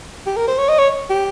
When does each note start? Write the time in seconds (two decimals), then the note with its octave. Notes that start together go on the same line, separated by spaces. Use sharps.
0.26 G4
0.37 A#4
0.48 C5
0.58 C#5
0.69 D#5
0.78 C#5
1.10 G4